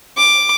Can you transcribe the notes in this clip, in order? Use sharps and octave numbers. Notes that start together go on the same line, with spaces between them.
D6